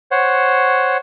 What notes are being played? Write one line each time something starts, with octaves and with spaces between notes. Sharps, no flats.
C5 C#5 F#5